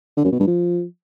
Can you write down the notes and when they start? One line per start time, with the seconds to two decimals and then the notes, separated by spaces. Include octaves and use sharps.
0.17 D3
0.24 F#2
0.32 B2
0.40 G2
0.48 F3